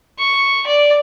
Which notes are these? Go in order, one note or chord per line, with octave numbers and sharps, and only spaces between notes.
C#6
D5